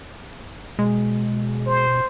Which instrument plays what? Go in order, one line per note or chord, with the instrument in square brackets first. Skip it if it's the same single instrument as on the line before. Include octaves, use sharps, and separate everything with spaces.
[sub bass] B2 [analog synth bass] G#3
[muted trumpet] C5